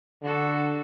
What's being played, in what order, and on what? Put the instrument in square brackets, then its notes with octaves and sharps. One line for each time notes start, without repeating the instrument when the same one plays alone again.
[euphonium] D3 [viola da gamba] D4 F#4 A4